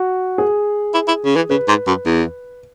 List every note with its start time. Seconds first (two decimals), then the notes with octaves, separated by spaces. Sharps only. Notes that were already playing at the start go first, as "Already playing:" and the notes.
Already playing: F#4
0.38 G#4
0.94 E4
1.08 E4
1.25 C#3
1.36 E3
1.50 C#3 B4
1.68 G#2
1.87 F#2
2.06 E2